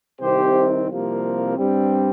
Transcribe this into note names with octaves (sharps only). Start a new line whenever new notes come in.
C2 C3 D#3 C4 G4 C5
C2 C3 F3 A#3
G2 G3 C4